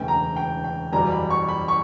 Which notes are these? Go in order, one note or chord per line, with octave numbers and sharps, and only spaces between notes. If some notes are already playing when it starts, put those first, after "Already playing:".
Already playing: E1 D2 C#3 E3 G5
A#5
G5
G5
F#1 E2 B2 G3 A#5
B5
C#6
B5
C#6